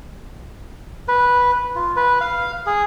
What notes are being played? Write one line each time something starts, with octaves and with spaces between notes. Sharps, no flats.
B4
F4
B4
F5
G#4